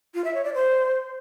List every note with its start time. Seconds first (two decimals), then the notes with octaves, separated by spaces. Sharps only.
0.15 F4
0.24 E5
0.34 C#5
0.44 D5
0.54 C5